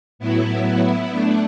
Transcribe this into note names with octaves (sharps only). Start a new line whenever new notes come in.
A2 F#3 B3 E4
A3 D4